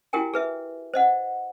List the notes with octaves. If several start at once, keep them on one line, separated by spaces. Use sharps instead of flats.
E4 F#4 G4 A#4 G5 G#5
G#4 B4 E5
C5 D#5 F#5